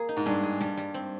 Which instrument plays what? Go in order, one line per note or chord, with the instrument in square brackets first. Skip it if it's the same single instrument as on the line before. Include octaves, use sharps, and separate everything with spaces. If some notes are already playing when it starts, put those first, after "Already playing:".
Already playing: [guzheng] A#3 G#4
D#4
[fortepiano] G#2
[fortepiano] G2 [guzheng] G#4
[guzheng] G#4
[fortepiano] G2 [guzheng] G3
[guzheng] G3
C4